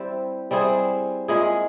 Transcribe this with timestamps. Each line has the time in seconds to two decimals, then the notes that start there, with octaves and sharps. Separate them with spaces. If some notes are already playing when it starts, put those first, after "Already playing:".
Already playing: G3 C4 E4 G4
0.51 G3 C4 E4 G#4
1.28 A#2 G#3 E4 G#4